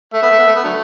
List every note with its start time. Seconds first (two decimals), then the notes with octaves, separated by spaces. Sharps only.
0.14 A3 E5
0.23 B3
0.31 A3
0.39 B3
0.47 A3
0.56 B3
0.64 D3 F#3 A3